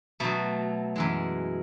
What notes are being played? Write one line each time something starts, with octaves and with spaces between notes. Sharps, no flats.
B2 F#3 A3
F#2 E3 G#3